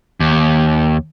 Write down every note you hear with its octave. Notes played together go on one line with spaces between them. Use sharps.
D#2